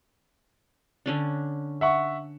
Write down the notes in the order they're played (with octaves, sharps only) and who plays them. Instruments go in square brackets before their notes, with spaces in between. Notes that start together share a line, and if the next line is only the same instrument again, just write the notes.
[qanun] D3 C#4 D4
[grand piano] E5 F#5 C#6